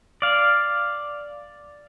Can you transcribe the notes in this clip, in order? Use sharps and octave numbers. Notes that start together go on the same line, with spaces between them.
D5 F5